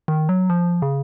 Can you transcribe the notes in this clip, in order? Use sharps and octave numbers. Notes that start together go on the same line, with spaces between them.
D#3
F#3
F3
C#3